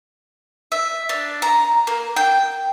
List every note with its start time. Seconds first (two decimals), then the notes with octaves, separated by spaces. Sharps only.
0.72 E5
1.09 D4
1.42 A#5
1.87 A#3
2.16 G5